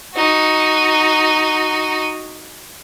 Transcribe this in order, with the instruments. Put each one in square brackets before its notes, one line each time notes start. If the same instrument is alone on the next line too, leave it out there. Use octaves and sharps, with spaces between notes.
[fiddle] D#4 F#4